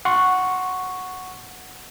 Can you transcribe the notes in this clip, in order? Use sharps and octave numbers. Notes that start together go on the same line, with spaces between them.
F#5 C6 C#6